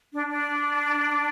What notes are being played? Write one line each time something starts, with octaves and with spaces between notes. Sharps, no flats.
D4
D4